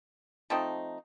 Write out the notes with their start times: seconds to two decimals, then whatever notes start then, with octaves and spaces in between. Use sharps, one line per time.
0.50 F3 A3 C4 D#4